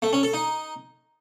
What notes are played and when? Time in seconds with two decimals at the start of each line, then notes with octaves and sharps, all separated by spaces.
0.02 A3
0.13 C#4
0.23 A4
0.33 D#4